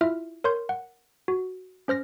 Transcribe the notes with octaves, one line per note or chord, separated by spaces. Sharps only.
E4 F4 E5 F6
A#4 C#5 C6 G6
F#5
F#4
C#4 C5 F6 A#6